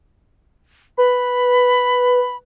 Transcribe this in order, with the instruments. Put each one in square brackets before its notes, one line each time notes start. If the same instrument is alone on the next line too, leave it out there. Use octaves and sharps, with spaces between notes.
[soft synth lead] B4 [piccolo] B5